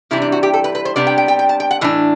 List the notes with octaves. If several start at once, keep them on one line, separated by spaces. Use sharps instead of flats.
C3 E3 G3 D4 E4
D4
F#4
G4
A4
B4
B4
C5
C3 G3 B3 D4 D5
G5
G5
G5
G5
A5
G5
F#5
A2 E3 D4